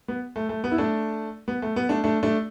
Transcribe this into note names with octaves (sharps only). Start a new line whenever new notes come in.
B3
A3
A3
B3
E4
A3 D4
B3
A3
B3
A3 D4
A3 D4
A3 D4